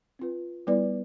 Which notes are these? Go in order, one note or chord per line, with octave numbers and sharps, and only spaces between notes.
C4 F4 B4
G3 B3 E4 B4 D5